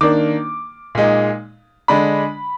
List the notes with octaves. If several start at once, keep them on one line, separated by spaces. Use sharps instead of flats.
D#3 A#3 D4 D6
A#2 G#3 D#4
D3 G#3 D4 B5